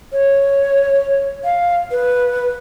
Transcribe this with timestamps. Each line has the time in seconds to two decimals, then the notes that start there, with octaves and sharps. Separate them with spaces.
0.12 C#5
1.44 F5
1.91 B4